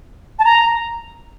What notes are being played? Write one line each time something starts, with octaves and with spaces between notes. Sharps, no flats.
A5
A#5